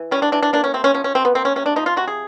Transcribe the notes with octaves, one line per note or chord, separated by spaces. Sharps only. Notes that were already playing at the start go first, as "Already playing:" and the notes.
Already playing: E3
G3 C#4
D4
E3 D4
D4
A#3 D4
C#4
C3 C4
C#4
F3 C#4
C#4
C3 C4
B3
A#3 C4
C#4
C3 C#4
D4
F3 D#4
F4
C3 F#4
G#4